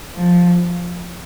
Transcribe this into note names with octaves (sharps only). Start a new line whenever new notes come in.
F3